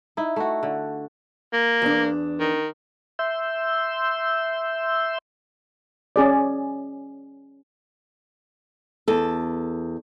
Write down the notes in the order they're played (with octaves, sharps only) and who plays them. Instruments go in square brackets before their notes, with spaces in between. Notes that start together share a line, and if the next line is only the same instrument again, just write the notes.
[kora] D#4 E4
A3 F#4
D3
[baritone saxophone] A#3
[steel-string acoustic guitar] E2 D4
[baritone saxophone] D#3
[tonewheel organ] E5 C6 E6 G6
[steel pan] C#4 G#4 D5
[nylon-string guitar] E2 A4